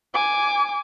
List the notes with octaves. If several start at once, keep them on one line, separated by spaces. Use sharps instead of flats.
G#5 D6